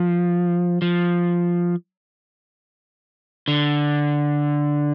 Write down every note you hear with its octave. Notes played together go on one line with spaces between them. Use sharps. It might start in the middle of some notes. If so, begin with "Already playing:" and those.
Already playing: F3
F3
D3